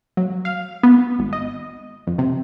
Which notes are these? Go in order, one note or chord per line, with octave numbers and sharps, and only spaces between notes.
F#3
F5
B3
G#1
D#5
F2
C3